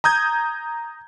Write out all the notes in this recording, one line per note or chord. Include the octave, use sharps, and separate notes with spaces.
A#5 D#6 G6 G#6